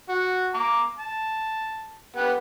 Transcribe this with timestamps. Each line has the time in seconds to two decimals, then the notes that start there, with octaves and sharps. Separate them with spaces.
0.09 F#4
0.54 A#5 D6
0.98 A5
2.16 B3 G4 F#5